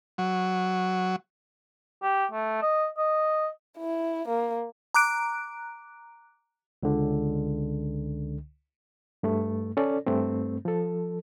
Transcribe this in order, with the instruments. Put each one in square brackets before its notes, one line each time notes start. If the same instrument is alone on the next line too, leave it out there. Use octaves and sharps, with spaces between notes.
[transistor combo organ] F#3
[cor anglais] G4
A3
D#5
D#5
[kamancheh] E4
A#3
[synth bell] A#5 D6 F#6 D7
[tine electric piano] C#2 D3
[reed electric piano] G2 A3
C#4 A4 D5
G2 A3 C4
F3 A4